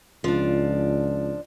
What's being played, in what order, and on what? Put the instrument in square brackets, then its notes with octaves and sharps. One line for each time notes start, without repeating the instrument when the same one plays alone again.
[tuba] C#2 [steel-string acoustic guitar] F3 D4